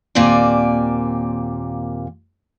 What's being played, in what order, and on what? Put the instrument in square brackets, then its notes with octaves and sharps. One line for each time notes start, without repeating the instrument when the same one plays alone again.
[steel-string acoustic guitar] D#2 A#2 A#3 C4 D5 G#5